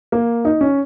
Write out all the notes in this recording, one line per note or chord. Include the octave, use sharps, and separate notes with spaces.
A#3
D#4
C#4